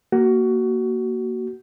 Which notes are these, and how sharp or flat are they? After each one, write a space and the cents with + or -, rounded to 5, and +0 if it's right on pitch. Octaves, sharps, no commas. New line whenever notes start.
A#3 +0 F#4 +20